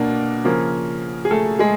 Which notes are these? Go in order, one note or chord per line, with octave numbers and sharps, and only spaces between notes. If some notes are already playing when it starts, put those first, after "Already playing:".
Already playing: B2 A#3 D4
C#3 F3 A#3 C#4
G#4
A3 A4
G#3 G#4